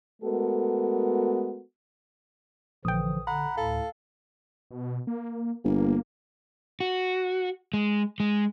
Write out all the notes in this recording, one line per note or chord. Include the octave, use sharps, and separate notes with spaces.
G#3 A3 B3 F#4 A4 A#4
A#1 D3 E3 F3 G5 D#6
D3 F#5 A#5 B5
D2 A2 A4 F5
B2
A#3
G1 A#3
F#4
G#3
G#3